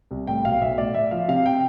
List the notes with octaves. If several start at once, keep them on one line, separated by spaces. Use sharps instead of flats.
C2
A2 G5
B1 F5
B1 E5
A2 D5
A2 E5
F3 F5
C3 F5
G5